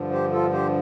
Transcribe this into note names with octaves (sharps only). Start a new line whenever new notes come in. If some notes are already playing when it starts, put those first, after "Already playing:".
Already playing: G2 D3 F3
G4 C5
F4 A4
G4 C5